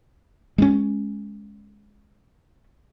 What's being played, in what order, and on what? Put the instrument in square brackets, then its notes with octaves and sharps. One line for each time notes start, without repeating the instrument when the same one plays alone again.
[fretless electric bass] G#3 B3 C#4